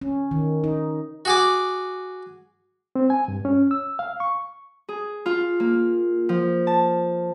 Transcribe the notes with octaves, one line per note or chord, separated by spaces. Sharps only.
C#4
D#3
D#4
F#4 G#4 D6
C4
G#5
G2
C#4
E6
F5
C#6
G#4
F4
A#3
F3
A5